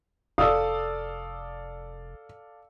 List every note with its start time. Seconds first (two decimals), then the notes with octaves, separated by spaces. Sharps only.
0.38 F1 A4 D5 F5 D#6 E6